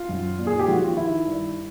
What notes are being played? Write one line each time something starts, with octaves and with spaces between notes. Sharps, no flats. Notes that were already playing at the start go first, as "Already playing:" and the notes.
Already playing: F4
F#2
A#2
G#4
G4
F3 F#4
F4
D#3 E4
G2